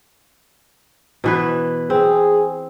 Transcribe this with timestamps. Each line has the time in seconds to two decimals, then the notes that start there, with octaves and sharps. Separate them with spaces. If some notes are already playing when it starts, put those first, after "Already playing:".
1.24 B2 E3 B4
1.90 C4 G#4